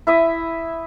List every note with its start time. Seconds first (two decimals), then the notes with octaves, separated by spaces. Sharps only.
0.07 E4 E5 D#6